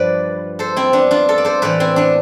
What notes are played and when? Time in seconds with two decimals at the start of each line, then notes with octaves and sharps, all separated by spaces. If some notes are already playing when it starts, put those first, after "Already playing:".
Already playing: G2 F3 B4 D5
0.59 A4 C5
0.76 C4 E4
0.93 B3 D4
1.11 D4 F4
1.28 F4 A4
1.38 D5
1.45 A4 C5
1.62 A2 E3 B4 D5
1.80 C4 E4
1.96 B3 D4